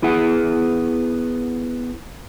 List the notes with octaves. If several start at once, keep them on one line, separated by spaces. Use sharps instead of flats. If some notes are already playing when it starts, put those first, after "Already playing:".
B3 E4 G#4 F#5